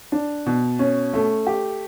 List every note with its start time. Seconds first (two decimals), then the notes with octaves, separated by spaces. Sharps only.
0.12 D4
0.46 B2
0.79 C#4
1.14 A3
1.47 G4